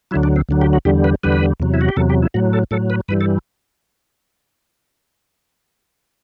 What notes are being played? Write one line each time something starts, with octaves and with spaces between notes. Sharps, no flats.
D2 D3 F#3 E4
D4
C4
D2 D3 F#3
G4
F#4
E2 D3 G3 G4
B4
E2 D3 G3 B4
E2 C3 F#3
E4
F#4
G4
E2 C3 F#3 A4
G4
E4
A2 F#3 F#4
A4
A2 F#3 A4
B4
G2 E3 G3 B4
A4